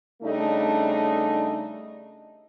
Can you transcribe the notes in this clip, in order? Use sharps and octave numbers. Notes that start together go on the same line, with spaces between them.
C#3 G3 A3 D4 D#4